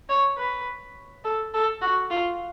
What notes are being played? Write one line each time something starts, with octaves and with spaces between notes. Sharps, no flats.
C#5
B4
A4
A4
F#4
F4